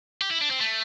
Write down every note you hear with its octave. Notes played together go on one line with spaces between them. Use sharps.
G4
E4
D4
C4
A3